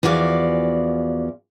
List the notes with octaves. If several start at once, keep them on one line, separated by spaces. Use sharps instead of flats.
E2 E3 F3 F#4 D5 F5